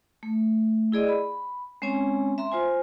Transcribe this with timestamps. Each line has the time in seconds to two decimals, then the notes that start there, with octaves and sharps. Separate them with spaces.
0.23 A3
0.92 E4 G#4 D5 D#5
1.08 B5
1.82 G#3 C4 C#4 C#5 G#5
2.38 E5 A#5 C6
2.52 F4 C5 G#5